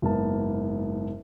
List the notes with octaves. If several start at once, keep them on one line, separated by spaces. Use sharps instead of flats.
F#1 G#2 A#3 B3 A5